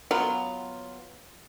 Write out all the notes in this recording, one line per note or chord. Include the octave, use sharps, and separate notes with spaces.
F#3 B3 F4